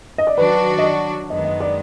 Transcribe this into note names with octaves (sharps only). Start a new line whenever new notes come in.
D#5
D5
D#3 F#3 D4 F#4 B4
D#5
D5
F#2 D#3 G#3 B3 D#5
D#5
D5